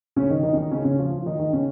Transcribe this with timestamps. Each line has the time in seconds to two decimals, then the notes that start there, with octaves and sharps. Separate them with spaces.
0.16 C#3 C#4
0.30 D#3 D#4
0.43 D#3 D#4
0.53 C#4
0.57 D#3 D#4
0.71 C#3 C#4
0.85 C#3 C#4
0.99 F3 F4
1.12 F3 F4
1.26 D#3 D#4
1.39 D#3 D#4
1.53 C#3 C#4